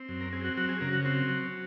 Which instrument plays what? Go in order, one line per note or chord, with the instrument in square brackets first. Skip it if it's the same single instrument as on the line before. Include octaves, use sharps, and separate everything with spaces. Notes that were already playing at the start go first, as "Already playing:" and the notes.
Already playing: [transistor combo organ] C4
F#2
A#4
C4 G#4
F#4
F#3 F#4
G#4
C#3 A#4
F#4
C4 F#4
F#3